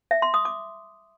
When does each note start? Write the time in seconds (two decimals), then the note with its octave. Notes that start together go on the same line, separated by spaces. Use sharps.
0.11 E5
0.22 C6
0.34 D#6
0.45 D6